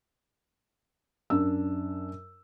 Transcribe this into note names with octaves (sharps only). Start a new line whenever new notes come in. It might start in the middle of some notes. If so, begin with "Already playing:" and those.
F#2 D4 E6